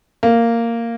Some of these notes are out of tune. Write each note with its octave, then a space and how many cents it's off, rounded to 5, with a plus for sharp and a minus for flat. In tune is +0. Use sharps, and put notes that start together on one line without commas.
A#3 -10